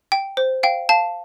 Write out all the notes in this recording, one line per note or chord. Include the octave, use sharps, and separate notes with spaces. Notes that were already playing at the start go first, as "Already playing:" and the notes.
G5
C5
F5 G5
F5 A5